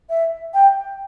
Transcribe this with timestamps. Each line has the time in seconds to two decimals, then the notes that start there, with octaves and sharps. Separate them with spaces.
0.10 E5
0.54 G5